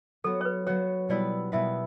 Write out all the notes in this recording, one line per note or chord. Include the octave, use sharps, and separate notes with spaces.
F#3 B3 F#4 A4
C#5
B4
F#3 B3 F#4 C#5
B2 G3 B3 E4 B4 D5
B2 G3 B3 E4 B4 E5